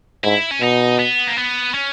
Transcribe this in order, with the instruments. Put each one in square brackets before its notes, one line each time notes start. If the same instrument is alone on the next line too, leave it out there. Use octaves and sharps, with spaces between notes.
[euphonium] G#2 [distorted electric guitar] E4
[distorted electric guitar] C#4
[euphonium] B2 [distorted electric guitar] D#4
[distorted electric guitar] B3
A#3
B3
C#4